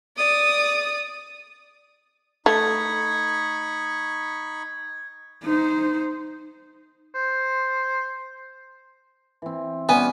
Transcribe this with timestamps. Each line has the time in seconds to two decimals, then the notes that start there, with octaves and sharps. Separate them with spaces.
0.17 D5 D#6
2.46 A3 D#4 B5 C#6 G#6
5.44 D#4 C5
7.15 C5
9.42 E3 C4
9.89 G3 B3 C#4 G#5